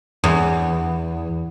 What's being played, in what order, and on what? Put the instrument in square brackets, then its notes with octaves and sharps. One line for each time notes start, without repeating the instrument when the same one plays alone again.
[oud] E2